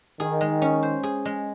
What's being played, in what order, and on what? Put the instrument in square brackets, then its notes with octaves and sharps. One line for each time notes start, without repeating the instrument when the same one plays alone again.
[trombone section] D#3 [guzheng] G#4
[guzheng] G#3
C#4
C5
G#4
G#3